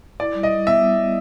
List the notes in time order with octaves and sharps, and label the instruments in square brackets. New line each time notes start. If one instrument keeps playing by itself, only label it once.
[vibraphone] E4 [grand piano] D5
[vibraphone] G3
[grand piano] D#5
[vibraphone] G3
[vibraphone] B3 [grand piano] E5
[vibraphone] G3
G3